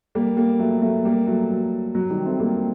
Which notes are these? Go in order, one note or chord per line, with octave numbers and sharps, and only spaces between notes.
G3 A#3
G3 A#3
F#3 A3
F#3 A3
G3 A#3
F#3 A3
F#3
F#3
D#3 G3
A3 C4
G3 A#3